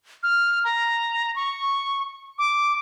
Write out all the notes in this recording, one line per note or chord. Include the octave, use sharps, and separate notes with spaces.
F6
A#5
C#6
D6